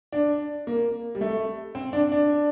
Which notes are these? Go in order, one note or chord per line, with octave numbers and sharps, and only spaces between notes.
D4
A#3
G3
A3
C4
D4
D4